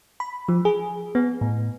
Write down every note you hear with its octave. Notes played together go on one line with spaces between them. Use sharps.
B5
F3
G#4
B3
A2